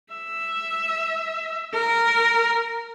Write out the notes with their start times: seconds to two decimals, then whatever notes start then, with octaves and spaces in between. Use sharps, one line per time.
0.14 E5
1.73 A#4